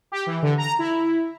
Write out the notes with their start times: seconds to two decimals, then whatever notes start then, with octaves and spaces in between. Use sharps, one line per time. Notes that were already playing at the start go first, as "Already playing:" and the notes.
0.12 G4
0.26 E3
0.43 D3
0.58 A#5
0.79 E4